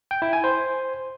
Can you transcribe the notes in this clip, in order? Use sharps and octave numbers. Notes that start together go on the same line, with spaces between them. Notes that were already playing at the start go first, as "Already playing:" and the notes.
G5
E4
G#5
C5